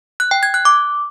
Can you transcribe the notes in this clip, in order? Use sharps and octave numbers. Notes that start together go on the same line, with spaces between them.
F#6
G5
G#6
F#6
D6